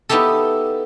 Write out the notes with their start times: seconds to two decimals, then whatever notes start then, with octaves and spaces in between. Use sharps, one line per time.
0.09 B3 D#4 E4 G4 A4